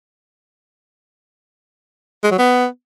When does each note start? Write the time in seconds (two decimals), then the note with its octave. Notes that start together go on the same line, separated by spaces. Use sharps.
2.24 G#3
2.31 F#3
2.38 B3